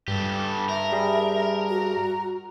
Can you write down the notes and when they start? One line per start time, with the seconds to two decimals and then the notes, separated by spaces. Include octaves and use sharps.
0.08 G2 G4 A4
0.69 A#4 E5
0.92 G3 G#4
1.69 F#4